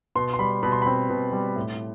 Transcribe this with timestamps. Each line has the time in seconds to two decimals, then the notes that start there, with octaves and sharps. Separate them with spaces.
0.15 B2 C6
0.33 C6
0.39 G3 B5
0.63 B2 B5
0.72 C6
0.82 C4 B5
1.09 B2
1.33 G3
1.56 A2